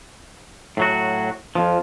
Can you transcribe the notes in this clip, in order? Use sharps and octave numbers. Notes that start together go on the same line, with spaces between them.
A2 F#3 F#4
F2 F3